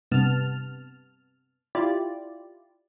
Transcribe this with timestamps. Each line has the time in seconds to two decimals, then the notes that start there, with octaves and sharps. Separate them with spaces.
0.12 G2 C3 B3 A5 F6
1.75 E4 F4 G4 D5